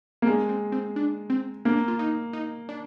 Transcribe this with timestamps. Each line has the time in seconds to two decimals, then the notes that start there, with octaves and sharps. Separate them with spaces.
0.22 A#3
0.27 G#3 D4
0.49 C4
0.72 C4
0.96 D4
1.30 C4
1.65 A#3 D4
1.88 F4
1.99 D#4
2.33 D#4
2.69 D4